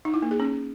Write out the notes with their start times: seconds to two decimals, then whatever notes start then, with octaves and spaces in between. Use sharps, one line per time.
0.05 D#4
0.14 E4
0.22 A#3
0.31 G#4
0.40 C#4